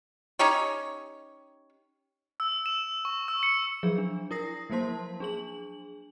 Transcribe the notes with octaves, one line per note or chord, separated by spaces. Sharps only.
C#4 D#4 G4 C#5
E6
E7
C#6
E6
C#7
F3 F#3 G#4
D4
E4 A#4 D#6 A#6 C7
F3 F#3 A#3 C5 A5 C6
D4 G#4 F#7